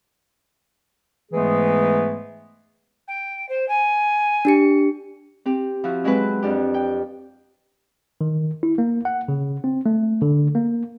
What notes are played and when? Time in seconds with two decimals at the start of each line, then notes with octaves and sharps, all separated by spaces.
1.32 G#2 E3 G#3 A3 B3 G#4
3.07 G5
3.48 C5
3.68 G#5
4.45 D4 G4 C#7
5.46 C4 G4
5.84 F3 E4 F#4
6.04 F#3 G#3 C4 F#4 B4
6.43 F2 D4 G4
6.74 G5
8.21 D#3
8.63 E4
8.78 A#3
9.05 F#5
9.28 C#3
9.64 C4
9.86 A3
10.22 D3
10.55 A#3